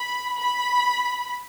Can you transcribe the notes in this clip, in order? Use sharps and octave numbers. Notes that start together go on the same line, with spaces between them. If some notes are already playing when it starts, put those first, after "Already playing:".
Already playing: B5
B5